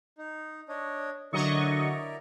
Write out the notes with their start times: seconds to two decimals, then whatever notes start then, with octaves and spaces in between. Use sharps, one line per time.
0.18 D#4
0.69 D4 C#5 D#5
1.33 D3 F#3 E4 A#4 D5 D#5 C#6